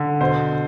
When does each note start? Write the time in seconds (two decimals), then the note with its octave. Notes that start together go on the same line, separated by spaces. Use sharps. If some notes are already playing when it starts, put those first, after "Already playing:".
Already playing: D3
0.21 B2 C5